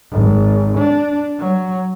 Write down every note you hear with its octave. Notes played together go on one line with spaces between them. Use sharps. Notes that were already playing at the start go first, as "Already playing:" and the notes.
G#1
D4
F#3